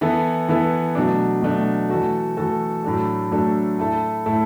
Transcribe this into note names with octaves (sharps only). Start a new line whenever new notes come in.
E3 B3 E4 A4
E3 B3 E4 A4
B2 F#3 A3 D4
B2 F#3 A3 D4
E3 A3 F#4 A4
E3 A3 F#4 A4
A2 F#3 A3 D4 A4
A2 F#3 A3 D4 A4
A2 A3 E4 A4
A2 A3 E4 A4